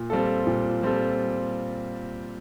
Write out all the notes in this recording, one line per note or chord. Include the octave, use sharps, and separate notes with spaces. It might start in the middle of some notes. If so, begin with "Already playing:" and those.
Already playing: A#2
G3 C4 F4 A4
A#2
G3 C4 F4 A4